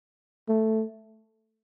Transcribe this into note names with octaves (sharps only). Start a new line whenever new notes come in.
A3